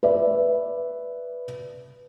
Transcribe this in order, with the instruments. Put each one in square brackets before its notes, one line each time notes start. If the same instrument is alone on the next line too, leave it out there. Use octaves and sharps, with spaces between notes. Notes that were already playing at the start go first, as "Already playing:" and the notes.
[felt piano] B4 D5 E5